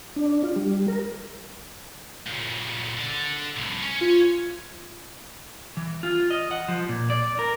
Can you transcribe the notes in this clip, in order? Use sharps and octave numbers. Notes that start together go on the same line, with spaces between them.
D4
F4
G3
A#4
A#2 C#3
D3 D5
C2 A2
C#4 C#5
F4
E3
F4
D#5
F#5
F3
A#2
D5
A#4